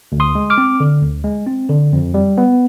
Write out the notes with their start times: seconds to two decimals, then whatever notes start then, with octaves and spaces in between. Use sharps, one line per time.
0.12 D2
0.20 C6 D#6
0.35 G#3
0.50 D6 F6
0.58 C4
0.80 D3
1.02 D2
1.24 G#3
1.47 C4
1.69 D3
1.92 F2
2.14 G3
2.38 B3